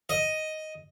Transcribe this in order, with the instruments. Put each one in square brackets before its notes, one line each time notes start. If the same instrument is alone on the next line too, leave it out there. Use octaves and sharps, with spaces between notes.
[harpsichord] D#5